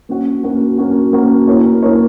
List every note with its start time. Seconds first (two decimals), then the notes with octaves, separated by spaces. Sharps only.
0.09 A#3 C#4 F#4
0.43 A#3 C#4 F#4
0.78 A#3 C#4 F#4
1.13 A#3 C#4 F#4
1.47 A#3 E4 A#4 C#5
1.82 A#3 E4 A#4 C#5